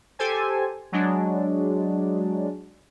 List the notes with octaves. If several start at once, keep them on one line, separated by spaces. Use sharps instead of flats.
G4 A4 C5 G#5
F#3 G#3 D4